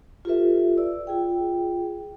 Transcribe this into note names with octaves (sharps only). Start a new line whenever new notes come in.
F4 G4 A4 B4 E5
D5 E6
F4 G#4 G5